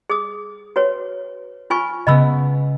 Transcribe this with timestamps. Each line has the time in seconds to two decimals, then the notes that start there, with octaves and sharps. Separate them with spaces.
0.10 G#4 D#6
0.76 F#4 B4 C#5
1.70 F4 G#5 C#6 F6
2.07 C#3 G#3 B3 D#5 B5 E6